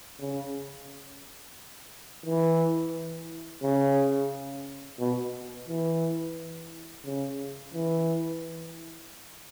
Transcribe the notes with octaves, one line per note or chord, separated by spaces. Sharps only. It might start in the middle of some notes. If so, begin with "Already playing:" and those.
C#3
E3
C#3
B2
E3
C#3
E3